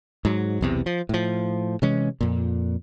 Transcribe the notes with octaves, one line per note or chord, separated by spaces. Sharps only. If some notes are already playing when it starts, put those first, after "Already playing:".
G#2 F#3
B1 E2 C3
F3
A2 F3
C3 E3 G#3 C#4
F2 A#2